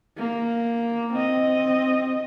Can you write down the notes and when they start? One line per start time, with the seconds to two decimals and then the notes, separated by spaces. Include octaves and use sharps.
0.18 A#3
1.13 C4 D#5